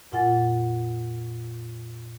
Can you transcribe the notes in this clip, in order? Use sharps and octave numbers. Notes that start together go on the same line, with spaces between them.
F2 A#2 F4 F#5 G#5 A6